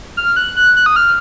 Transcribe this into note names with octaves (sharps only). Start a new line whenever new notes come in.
F6
F#6
F#6
F#6
D#6
F6